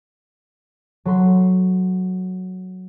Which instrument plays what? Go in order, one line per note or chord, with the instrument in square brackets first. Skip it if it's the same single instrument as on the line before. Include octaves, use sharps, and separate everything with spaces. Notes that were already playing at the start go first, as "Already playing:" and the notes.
[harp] F#3 A4 C6 B6